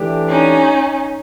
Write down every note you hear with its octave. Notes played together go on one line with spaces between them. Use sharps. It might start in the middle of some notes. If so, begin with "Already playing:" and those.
Already playing: E3 A3 D4 G4
C#4 D#4